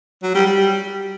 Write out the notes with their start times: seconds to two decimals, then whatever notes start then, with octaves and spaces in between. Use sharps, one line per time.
0.23 F#3
0.35 G3
0.47 G3